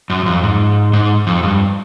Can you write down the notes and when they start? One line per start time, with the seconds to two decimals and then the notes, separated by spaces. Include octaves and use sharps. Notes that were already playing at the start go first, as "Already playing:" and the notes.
0.10 F#2
0.26 F2
0.43 G#2
0.93 G#2
1.27 F2
1.43 G2